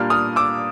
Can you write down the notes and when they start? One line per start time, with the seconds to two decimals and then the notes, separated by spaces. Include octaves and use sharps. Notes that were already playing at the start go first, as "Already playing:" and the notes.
Already playing: A#2 G3 A#3 D4 F6
0.10 D#6 F6
0.36 D6 E6